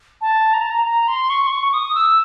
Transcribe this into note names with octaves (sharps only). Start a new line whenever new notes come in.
A5
A#5
A5
A#5
A#5
C6
C#6
C6
C#6
D#6
E6